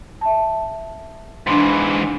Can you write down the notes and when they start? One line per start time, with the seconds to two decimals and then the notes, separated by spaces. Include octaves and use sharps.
0.21 E5 A5
1.47 G#2 E3 D4 C6